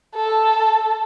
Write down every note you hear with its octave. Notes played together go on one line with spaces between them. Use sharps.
A4